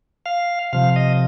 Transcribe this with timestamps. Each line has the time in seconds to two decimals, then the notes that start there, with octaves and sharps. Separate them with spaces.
0.26 F5
0.73 C3 F3 F5
0.96 D#5